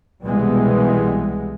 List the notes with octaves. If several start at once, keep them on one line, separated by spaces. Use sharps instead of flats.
C2 B2 E3 G3 G#3 B3